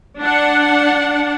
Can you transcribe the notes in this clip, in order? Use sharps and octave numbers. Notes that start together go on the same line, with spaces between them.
D4 F#5